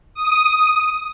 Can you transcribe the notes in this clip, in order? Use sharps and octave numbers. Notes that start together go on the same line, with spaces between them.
D#6